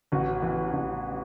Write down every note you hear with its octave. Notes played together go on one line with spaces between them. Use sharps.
A1 F#4
E3
A1